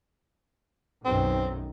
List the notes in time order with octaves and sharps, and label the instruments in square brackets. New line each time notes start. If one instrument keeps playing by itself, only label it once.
[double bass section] B1 F#2 D#3 [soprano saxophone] C4